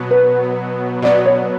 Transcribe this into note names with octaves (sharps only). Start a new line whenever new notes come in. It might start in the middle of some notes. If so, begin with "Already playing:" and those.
Already playing: B2 F#3 B3
B4
B2 F#3 B3 D5
C#5